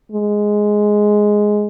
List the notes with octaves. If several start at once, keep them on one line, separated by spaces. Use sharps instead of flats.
G#3